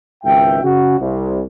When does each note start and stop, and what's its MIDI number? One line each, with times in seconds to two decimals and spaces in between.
0.24 0.61 32
0.24 0.61 37
0.24 0.61 76
0.24 0.61 79
0.63 0.95 49
0.63 0.95 66
0.99 1.42 36